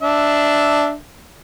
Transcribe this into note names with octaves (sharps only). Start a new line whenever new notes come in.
D4 E5